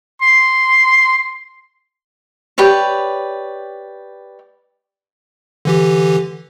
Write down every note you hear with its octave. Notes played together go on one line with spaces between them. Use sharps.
C6
G4 B4 C#5 D5
D3 E3 G4